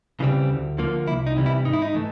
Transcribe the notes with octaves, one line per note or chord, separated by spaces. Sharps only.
C#3 E3 G3 C4
D2
D3 F3 A#3
C2 E4
D#4
C3 E3 G3
E4
G#2 D#4
E4
D#4
E3 A3